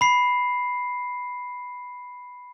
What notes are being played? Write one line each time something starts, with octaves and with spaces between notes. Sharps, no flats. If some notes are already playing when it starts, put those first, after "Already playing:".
B5 C7